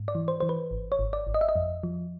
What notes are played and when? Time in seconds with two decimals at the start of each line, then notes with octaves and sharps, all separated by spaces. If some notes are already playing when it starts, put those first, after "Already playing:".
Already playing: G#2
0.08 D5
0.15 E3
0.28 C5
0.40 E3 C5
0.49 B4
0.71 G#1
0.92 C#5
0.99 G#1
1.13 D5
1.27 G#1
1.34 D#5
1.41 E5
1.49 D#5
1.56 F2
1.83 F3